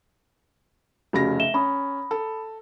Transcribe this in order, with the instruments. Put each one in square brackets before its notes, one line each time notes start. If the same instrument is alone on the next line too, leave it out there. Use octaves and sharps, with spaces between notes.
[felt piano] F1 C#3 A#6 [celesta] F#4 G4 B5
[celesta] E5 E7 G7
[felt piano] C#4 [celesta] A#5 B5 D#6
[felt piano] A4